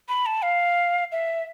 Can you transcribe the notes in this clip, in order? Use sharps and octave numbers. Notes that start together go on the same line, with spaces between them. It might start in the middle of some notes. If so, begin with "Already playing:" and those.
B5
A5
F5
E5